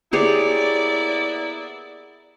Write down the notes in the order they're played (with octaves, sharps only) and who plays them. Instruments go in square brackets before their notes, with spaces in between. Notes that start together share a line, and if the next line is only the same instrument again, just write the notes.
[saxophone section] A#3 B3 E4 [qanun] G4 G#4 C#5 [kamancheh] D5